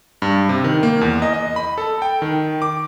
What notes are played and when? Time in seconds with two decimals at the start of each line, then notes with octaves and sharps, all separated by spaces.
0.22 G2
0.49 C3
0.64 D#3
0.83 A#3
1.01 E2
1.22 D#5
1.33 D#5
1.56 B5
1.78 A4
2.02 G5
2.22 D#3
2.62 D6